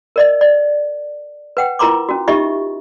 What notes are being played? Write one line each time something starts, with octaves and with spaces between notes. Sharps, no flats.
A#4 D5 D#5
D5
B4 F#5 G5
E4 F4 A#4 A#5 C6 D6
C#4 F#4
D#4 F4 G4 D#5 E5 C#6